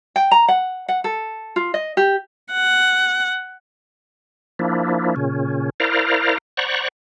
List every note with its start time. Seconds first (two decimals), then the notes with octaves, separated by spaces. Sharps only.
0.16 G5
0.31 A#5
0.48 F#5
0.88 F#5
1.04 A4
1.56 F4
1.74 D#5
1.97 G4
2.52 F#5
4.59 F3 A#3 D4 E4
5.16 A#2 C#3 C#4
5.80 E4 A#4 C5 D5 F5 A#5
6.57 C5 D5 F#5 A#5 B5 C#6